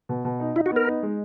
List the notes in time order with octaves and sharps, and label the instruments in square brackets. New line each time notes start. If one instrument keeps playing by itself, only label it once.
[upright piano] B2
B2
D#4
[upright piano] D#4 [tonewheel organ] E4
[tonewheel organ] F#4
[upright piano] B3 [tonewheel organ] A#4
[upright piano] D#4
G#3